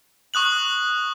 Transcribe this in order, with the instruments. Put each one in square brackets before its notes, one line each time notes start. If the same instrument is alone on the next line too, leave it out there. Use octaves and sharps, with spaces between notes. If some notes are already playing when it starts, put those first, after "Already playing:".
[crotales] C#6 D#6 F#6 F#7